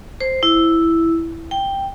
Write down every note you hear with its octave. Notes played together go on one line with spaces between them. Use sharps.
C5
E4
G5